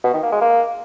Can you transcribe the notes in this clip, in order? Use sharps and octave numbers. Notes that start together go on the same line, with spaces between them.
B2
D#3
A#3
G#3
A#3